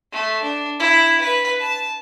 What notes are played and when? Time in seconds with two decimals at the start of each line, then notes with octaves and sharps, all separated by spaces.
0.12 A3
0.42 D4
0.79 E4
1.20 B4
1.59 A5